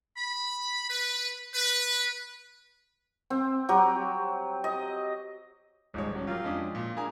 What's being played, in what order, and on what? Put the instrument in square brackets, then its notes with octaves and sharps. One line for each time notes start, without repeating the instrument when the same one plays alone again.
[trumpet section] B5
B4
B4
[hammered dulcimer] C4
F#3 G4
D#5
[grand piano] D#1 C#5 [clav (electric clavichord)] G#2 F3 [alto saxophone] G#3
[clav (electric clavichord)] F#3 [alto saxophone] C#4
[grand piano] F#3 [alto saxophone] F4 [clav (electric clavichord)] G4 A#4
[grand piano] F2 C#4 D4 [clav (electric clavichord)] G#3 G#4 D5
[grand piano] A#2 [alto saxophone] F4
[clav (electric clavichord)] A#3 G#4 [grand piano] D4 G#5 A#5